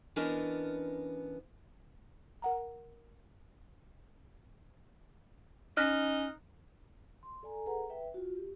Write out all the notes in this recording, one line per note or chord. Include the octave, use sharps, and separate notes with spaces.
E3 B3 C#4 D4 A#4 D#5
A#4 F#5 A#5
C#4 D#4 F6 F#6 A#6
C6
A4 D5 G#5 A#5
G#4 A4 B4 F#5 A#5
B4 E5 G5
F4 F#4
G4